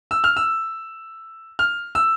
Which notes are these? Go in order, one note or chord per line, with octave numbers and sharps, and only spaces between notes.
E6
F6
E6
F6
E6